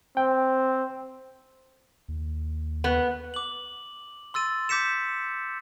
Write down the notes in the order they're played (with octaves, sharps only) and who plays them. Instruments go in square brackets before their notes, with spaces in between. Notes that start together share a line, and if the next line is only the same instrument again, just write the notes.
[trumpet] C4 [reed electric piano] G5
[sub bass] D#2
[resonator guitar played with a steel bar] B3
[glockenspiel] D6 F#7
C6 E6 A6 D#7
D6 G6 B6 C#7 E7